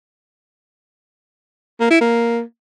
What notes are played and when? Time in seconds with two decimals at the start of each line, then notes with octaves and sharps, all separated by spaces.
1.80 A#3
1.91 E4
2.01 A#3